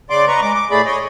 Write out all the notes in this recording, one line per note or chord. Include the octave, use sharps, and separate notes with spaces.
C#3 D5 C6 D6
B4 D#5 A#5 C#6
G#3 D6
D6
A2 A3 G#4 D5 B5
C#5 D#5